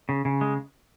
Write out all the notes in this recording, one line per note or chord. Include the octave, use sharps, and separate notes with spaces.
C#3
C#3
G#3